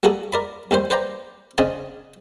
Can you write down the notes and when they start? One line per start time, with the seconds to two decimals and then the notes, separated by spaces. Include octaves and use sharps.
0.03 G3 A#3 F#4 G#4 A4
0.33 A#4 D5 B5
0.71 D#2 D#3 G3 C5
0.90 B4 C5 D5 G5 A#5
1.58 C#3 C4 D4 D#5 G#5 A5